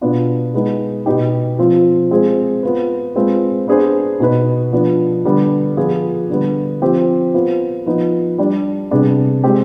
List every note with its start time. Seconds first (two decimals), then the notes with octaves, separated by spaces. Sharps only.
0.01 B2 B3 D4 F4
0.54 G#3 B3 D#4
1.06 B2 B3 D#4 G4
1.59 F3 C4 F4
2.11 G#3 C4 F4 G#4 C5
2.63 B3 F4 B4
3.15 G#3 C4 F4 B4
3.68 B3 D4 G#4 C5
4.20 B2 B3 D#4 B4
4.73 F3 B3 D4
5.25 D3 G3 B3 D4
5.77 F3 B3 F4 G#4
6.30 D3 G3 B3
6.82 F3 C4 G4 C5
7.34 B3 F4 C5
7.86 F3 B3 D#4
8.38 G3 D4 G4
8.91 C3 G3 B3 D4 G#4
9.44 G#3 C4 G4